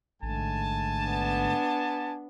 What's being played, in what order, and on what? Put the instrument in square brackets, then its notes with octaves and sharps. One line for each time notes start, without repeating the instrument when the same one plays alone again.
[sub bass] A1 [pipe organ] G#2 D3 A3 [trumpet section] G#5 A5
[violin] B3 D4